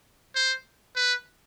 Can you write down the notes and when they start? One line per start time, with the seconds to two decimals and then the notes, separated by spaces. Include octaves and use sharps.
0.35 C5
0.96 B4